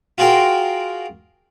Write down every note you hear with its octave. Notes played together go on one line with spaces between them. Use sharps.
F4 F#4 G#4 A#4 G5 C6